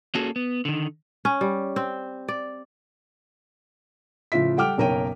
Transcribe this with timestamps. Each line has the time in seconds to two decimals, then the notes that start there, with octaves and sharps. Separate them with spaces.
0.15 A#3 C#4 F#4 G#4 A4
0.36 B3
0.65 D3 D#3
1.25 C#4
1.41 G3
1.76 C4
2.28 D5
4.32 A2 C#3 F3 F4 E5 B6
4.57 G3 A4 F#5 G5 D6 F6
4.78 F#1 B1 A#4 C#5 G5 D#7